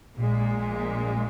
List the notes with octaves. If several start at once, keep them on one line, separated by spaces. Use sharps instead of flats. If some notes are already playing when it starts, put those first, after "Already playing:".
A#1 A#2 G#3